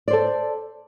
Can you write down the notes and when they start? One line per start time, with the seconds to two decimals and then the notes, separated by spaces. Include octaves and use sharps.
0.08 D5
0.10 C5
0.13 A4